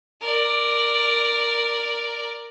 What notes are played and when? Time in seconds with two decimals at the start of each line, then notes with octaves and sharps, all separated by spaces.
0.21 A#4 D5